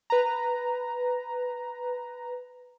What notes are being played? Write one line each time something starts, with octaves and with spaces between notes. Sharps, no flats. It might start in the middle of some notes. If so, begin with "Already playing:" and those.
B4 A#5